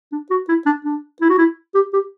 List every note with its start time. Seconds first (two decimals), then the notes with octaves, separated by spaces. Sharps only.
0.12 D4
0.30 F#4
0.48 E4
0.66 D4
0.84 D4
1.21 E4
1.30 F#4
1.38 E4
1.74 G4
1.93 G4